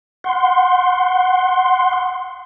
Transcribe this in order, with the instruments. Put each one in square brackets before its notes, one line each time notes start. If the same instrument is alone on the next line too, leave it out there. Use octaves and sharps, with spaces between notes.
[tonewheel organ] F#5 C6